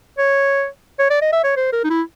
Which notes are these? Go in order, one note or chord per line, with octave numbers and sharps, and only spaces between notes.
C#5
C#5
D5
D#5
E5
C#5
C5
A#4
D#4
E4